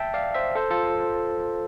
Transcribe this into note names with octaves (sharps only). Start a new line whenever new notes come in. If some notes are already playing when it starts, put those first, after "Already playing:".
Already playing: E5 G5 A5
D5 F5
C5 E5
A4 C5
F4 A4